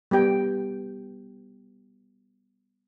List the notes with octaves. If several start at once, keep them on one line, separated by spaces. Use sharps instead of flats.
G3 B3 G4 G5